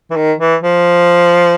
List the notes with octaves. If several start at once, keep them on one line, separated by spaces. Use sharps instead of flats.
E3
D#3
E3
F3